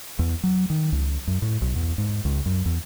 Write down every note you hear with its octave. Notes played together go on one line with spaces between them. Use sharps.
E2
F#3
D#3
C#2
F#2
A2
B1
E2
G#2
C#2
F#2
E2